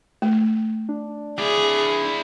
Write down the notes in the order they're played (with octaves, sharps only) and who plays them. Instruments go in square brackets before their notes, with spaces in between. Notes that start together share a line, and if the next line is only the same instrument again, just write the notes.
[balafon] A3
[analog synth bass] D4
[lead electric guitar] E4 D5 [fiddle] G#4